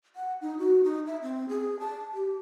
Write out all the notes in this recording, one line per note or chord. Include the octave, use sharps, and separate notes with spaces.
F#5
D#4
F#4
D#4
E5
C4
G#4
A5
G4